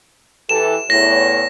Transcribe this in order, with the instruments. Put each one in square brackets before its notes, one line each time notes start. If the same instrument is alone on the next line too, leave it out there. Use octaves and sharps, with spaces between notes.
[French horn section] E3 G4 A4 [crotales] E7
[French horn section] E2 A2 C#5 [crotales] A#6